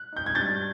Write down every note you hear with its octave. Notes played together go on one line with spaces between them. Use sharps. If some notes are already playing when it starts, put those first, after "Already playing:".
Already playing: F#6
D#4 G6
G#6
G2 G6 A6